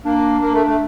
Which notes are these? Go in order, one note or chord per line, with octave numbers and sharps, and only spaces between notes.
A#3 D4
A#3
A3
A3